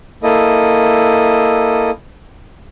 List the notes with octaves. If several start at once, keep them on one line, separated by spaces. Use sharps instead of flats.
A#3 E4 A4 D#5